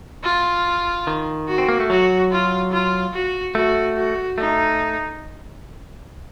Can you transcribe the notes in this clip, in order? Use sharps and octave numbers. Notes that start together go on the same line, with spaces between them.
F4
D#3
F#4
C4
A#3
A3
F#3 F#4
F4
F4
F#4
A3 F#4
F#4
A3 D#4